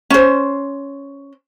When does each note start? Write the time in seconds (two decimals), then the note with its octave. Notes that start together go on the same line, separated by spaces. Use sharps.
0.10 C#4 C5